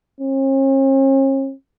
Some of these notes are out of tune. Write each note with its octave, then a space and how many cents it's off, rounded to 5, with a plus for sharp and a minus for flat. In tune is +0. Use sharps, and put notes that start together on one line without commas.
C#4 -45